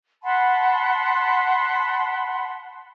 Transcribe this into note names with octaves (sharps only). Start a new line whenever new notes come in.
F#5 A5 B5 C6